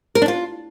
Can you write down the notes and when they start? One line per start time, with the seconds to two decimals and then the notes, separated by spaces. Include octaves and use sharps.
0.15 A#4
0.22 D4
0.28 F4